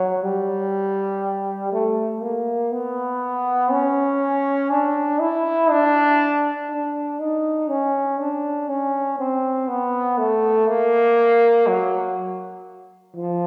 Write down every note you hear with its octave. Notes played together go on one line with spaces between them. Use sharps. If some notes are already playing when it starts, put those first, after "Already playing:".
Already playing: F#3
G3
A3
A#3
B3
C#4
D4
E4
D4
D4
D#4
C#4
D4
C#4
C4
B3
A3
A#3
F#3
F3